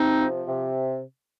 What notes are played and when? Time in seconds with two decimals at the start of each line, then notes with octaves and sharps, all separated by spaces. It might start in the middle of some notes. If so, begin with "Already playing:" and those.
Already playing: C3 C4 D#4
0.20 F3
0.47 C3